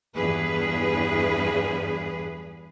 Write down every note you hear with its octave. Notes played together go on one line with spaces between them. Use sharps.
E2 G2 G#4 B4